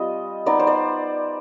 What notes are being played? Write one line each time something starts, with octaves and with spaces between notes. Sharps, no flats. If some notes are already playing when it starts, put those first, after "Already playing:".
Already playing: G3 C4 F4 D#5
B3 D#4 D5
C5
D5